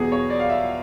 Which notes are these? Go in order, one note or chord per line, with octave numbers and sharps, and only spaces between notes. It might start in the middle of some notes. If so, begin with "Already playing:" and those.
Already playing: E2 B2 F#3 G#4
C#5
D5
F5
E5